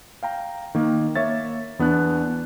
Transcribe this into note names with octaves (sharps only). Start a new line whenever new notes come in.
F5 G5 A#5
D#3 A#3
A#3 C#5 E5 A6
E2 B3 D4 F#6